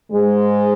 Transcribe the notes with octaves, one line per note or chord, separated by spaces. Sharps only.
G#2 G#3